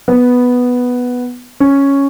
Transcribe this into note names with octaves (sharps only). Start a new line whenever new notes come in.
B3
C#4